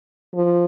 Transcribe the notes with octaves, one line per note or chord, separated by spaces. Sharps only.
F3